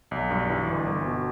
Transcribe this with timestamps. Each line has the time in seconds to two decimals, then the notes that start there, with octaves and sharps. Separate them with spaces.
0.11 B1
0.31 G2
0.50 E3
0.69 G1
0.86 G1
1.06 B2